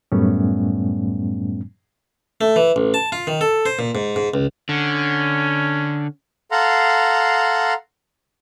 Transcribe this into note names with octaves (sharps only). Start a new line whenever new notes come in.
F#2 A2 G3 A3 B3 C#4
A3
E3
A1
A5
F4
D#3
A4
C5
A#2
G#2
G#2
C#2
D3 C#4
A4 F5 F#5 A#5 C6